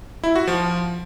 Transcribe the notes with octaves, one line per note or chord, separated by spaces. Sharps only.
E4
F#4
F3